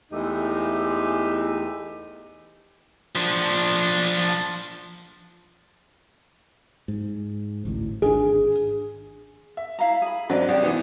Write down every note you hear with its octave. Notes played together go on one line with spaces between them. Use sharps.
E2 G#3 A3 D#4 G4
F3 D4
G#2
A1 D2 A2
G#1 D4 G#4
E5
E4 F5 A#5
G#4 B5
G#2 F#3 C4 D4 D5
C2 C#5 D5 G5
E3 B3 D#4 E4